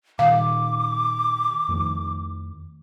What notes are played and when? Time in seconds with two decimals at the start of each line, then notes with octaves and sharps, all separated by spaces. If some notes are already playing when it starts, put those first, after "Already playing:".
0.19 A#2 D#3 F5 D6
1.69 F2 D#3 A3